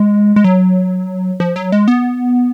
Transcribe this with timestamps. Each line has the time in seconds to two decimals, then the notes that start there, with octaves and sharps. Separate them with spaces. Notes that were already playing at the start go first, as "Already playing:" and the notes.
Already playing: G#3
0.36 G#3
0.44 F#3
1.40 F3
1.56 F#3
1.72 G#3
1.88 B3